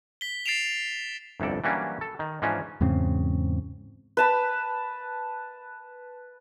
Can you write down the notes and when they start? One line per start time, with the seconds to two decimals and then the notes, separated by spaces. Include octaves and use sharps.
0.21 B6 G7
0.46 A6 C7 D7 E7 F7
1.40 G1 C2 F2 A4 D5
1.64 E3 F#3 G3 A#3 C#4 D4
2.01 A4
2.19 D#3
2.42 G#2 E3 F3 C#4 D4
2.81 E2 G#2 C#3 C4
4.17 B4 A5 B5